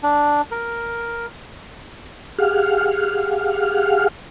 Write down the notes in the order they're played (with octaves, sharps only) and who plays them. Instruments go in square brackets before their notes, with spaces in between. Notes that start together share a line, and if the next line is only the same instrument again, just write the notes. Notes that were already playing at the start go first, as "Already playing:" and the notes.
[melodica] D4
A#4
[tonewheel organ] G4 G#4 F5 F#5 F6